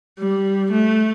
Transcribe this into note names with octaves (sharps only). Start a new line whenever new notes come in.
G3
A3